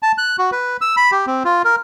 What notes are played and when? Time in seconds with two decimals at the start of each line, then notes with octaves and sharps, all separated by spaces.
0.03 A5
0.18 F#6
0.39 F#4
0.52 B4
0.81 E6
0.97 B5
1.12 G4
1.27 C4
1.45 F4
1.65 A#4